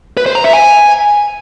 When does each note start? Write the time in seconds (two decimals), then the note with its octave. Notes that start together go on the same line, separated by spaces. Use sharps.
0.17 B4
0.26 C5
0.35 A#5
0.44 E5
0.53 G#5